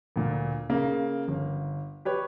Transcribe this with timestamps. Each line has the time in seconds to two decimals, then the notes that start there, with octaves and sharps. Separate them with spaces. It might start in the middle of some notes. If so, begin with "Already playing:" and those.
0.16 D2 A#2
0.69 C#3 A#3
1.28 G1
2.05 G4 B4 C#5